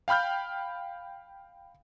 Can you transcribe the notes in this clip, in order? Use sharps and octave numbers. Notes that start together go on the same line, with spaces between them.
F5 G5 B5 F6 G6